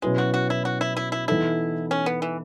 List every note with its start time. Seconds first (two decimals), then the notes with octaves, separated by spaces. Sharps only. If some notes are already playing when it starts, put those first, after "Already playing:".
0.02 B2 F#3 G#3 C#4 E4 B4
0.18 F#4
0.34 F#4
0.50 E4
0.65 F#4
0.81 E4
0.97 E4
1.12 E4
1.28 E3 B3 D#4 E4 A4
1.91 C#4
2.06 B3
2.22 E3